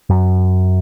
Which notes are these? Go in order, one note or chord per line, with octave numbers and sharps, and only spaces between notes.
F#2